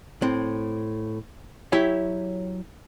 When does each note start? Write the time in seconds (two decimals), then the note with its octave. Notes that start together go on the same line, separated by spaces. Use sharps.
0.22 A2 C4
1.72 F#3 E4 G4 C#5 E5